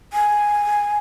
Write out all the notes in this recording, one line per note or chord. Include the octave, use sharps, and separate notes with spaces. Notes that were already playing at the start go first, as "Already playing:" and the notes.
G#5